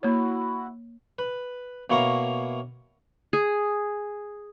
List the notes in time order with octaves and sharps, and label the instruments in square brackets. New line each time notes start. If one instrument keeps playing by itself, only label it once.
[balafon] A#3 C#5 [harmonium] E4 F#4
[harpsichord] B4
B2 A#3 E4 C#5 F5 A#5
[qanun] G#4